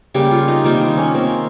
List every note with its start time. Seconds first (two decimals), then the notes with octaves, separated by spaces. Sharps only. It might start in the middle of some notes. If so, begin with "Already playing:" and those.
0.14 C#3 G3 A#3 G4
0.31 F4
0.48 D#4
0.64 C3 D#3 G3 A#3 F4
0.81 D#4
0.98 C#4
1.15 D#3 A#3 C4